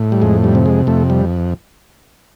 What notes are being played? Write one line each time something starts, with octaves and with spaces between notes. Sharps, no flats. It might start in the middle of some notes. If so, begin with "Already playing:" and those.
Already playing: A2
G3
F2 G#3
G3
C3
G#3
F2 A3
G3